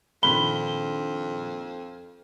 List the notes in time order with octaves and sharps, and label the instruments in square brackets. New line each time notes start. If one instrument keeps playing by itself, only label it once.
[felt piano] A#1 D#3 C6 [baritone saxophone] F2 [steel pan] B5 [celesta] G7